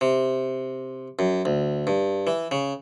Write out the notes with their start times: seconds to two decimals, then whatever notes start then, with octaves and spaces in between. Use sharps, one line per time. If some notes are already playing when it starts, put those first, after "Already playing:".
0.01 C3
1.19 F#2
1.45 D2
1.87 G2
2.27 E3
2.51 C#3